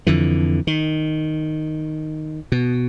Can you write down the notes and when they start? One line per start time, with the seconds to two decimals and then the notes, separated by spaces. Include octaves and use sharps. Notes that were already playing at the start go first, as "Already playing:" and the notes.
0.07 F2 D3 E3
0.67 D#3
2.52 B2